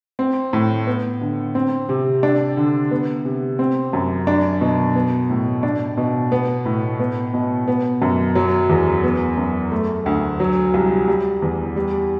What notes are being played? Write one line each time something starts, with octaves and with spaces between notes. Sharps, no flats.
C4
A2
B3
D3
C4
C3
D4
D3
B3
C3
C4
F#2
D4
B2
B3
A2
D4
B2
B3
A2
B3
B2
B3
F#2
F#3
E2
B3
F#2
A3
D2
F#3
C2
G3
E2
G3